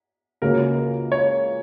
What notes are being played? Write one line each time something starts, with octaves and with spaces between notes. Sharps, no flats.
C#2 C#3 A#3 F#4 A#4 C#5
C#5